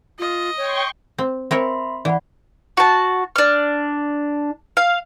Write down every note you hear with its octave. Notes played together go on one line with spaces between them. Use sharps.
F4 D#5
C#5 G5 C6 C#6
C4
C4 A#4 C#5 E5 B5 C6
E3 D5 F#5 B5
F#4 A5
D4 F6
F5